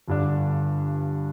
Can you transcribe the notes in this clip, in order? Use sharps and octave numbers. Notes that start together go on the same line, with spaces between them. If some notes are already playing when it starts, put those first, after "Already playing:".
G1 G2 D3 G3 D4